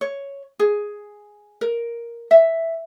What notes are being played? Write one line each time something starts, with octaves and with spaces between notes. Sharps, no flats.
C#5
G#4
A#4
E5